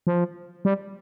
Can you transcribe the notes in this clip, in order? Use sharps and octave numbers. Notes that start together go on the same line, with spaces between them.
F3
G3